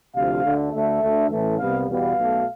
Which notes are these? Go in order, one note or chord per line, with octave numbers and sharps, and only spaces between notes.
D2 C3 F3 F5
D2 D3 A3
D2 D3 A3 E5
D2 D3 A3
A1 A2 E3 A3
C2 C3 G3 B3 F5
E2 B2 G3 B3 F5
B1 B2 A3